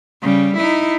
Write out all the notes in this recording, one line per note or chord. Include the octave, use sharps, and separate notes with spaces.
C#3 G3
D#4 E4